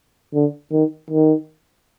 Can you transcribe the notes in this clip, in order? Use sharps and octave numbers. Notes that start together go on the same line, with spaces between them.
D3
D#3
D#3